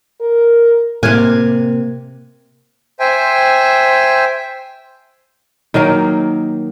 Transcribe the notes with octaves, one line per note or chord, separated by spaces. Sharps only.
A#4
A2 C3 A#3 G#5 F6 F#6
C5 E5 G5 G#5
D#3 F#3 A#3 D#4